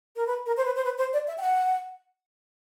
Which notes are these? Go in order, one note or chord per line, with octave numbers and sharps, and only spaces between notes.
A#4
B4
A#4
C5
B4
C5
B4
C5
D5
E5
G5
F#5